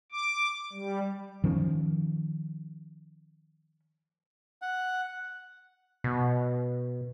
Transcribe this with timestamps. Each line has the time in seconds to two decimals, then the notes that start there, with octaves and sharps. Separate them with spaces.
0.12 D6
0.73 G3
1.44 D#3 F3 C#4
4.62 F#5
6.04 B2